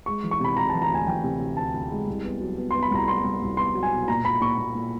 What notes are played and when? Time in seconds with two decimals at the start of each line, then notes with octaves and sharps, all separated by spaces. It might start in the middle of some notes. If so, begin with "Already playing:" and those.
0.06 G#3 C#6
0.24 E3
0.31 C#6
0.40 C3 B5
0.57 C3 A#5
0.69 E3 A5
0.82 A#5
0.90 D2 G#5
1.06 E3 G5
1.23 C3
1.40 C3
1.57 D2 A5
1.74 D2
1.91 G#3
2.07 C2
2.24 B3
2.41 F#3
2.58 B3
2.71 B3 C6
2.83 B5
2.91 C2 A#5
3.08 B3 C6
3.24 C2
3.41 C2
3.57 B3 C6
3.75 F#3
3.83 G#5
3.92 B2
4.08 A#2 A#5
4.24 A#2 B5
4.41 A#2 C#6
4.58 A#2
4.75 A#2